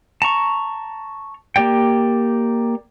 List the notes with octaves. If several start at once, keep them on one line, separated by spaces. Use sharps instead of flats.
A5 A#5 C#6
A#3 G4 D5 G5